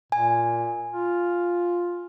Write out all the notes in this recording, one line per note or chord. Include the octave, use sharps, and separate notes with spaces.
A#2 G#5
F4